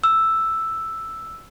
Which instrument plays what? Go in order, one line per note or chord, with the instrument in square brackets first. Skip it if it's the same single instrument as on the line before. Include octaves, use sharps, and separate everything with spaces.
[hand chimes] E6